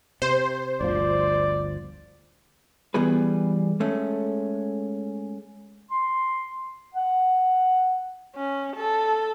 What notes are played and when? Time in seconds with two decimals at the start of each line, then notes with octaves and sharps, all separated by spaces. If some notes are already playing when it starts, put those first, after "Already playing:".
0.22 C3 C5
0.81 G1 D2 F3 D5
2.94 E3 G3 B3 G#4 B4
3.80 G#3 A3 C#4
5.91 C6
6.94 F#5
8.36 C#4
8.76 A4